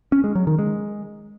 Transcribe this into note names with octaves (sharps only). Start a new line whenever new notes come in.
C#4
G#3
F#3
D#3
G#3